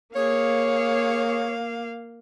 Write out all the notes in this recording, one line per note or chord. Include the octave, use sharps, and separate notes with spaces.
A#3 G#4 C#5 F5